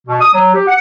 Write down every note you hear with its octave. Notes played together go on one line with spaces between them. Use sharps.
B2
D#6
F#3
G4
F#5